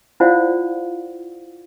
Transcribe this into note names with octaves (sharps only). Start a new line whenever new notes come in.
E4 F4 C5 D5 F5 F#5